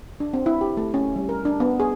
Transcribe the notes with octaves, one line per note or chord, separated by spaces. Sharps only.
D4
C4
E4
G4
A3
C#4
G3
A#4
D4
B3
G#4